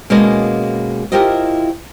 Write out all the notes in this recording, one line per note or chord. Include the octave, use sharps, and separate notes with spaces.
B2 G#3 A#3 C#4 D5 D#5
E4 F4 G4 A#4 C5 D#5